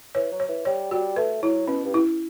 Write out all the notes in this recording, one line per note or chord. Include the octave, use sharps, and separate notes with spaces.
E3 C#5
F#3
C#5
E3
G3 C#5
G3 F#4
A3 B4
F#3 E4
B2 C#4
G2
E4